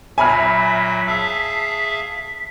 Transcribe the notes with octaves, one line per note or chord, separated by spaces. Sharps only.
A#2 F#3 E5 G#5 B5 F6 B6
G#4 E5 F5 A5 E6